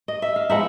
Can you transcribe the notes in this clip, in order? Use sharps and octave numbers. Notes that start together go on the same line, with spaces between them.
D#5
E5
F5
F3 G#3 B3 D#4 E5 F#5